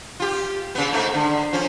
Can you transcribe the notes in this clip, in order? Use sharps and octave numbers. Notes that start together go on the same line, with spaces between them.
F4 G4
C#3 B3
G#2 A3 A#3
D3
F3 C#4